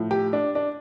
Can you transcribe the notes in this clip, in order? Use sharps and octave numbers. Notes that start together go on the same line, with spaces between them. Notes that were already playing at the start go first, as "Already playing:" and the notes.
Already playing: A2 F3
G4
D4
D4